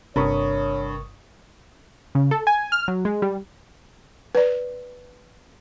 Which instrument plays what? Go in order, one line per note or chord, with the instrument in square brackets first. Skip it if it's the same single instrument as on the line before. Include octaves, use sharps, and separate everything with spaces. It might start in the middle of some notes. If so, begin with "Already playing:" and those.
[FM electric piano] G1 C#6 D#6 [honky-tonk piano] G2 [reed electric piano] C3 A#4 B5 [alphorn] C#5
[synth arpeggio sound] C#3
A4
G#5
F6
F#3
G#3
G3
[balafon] B4 D5